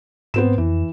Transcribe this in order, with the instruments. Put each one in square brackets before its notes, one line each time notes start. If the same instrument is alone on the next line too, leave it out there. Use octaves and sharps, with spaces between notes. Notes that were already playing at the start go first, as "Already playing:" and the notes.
[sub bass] G#2 [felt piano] B3 C4 E7
[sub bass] F2 [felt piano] E3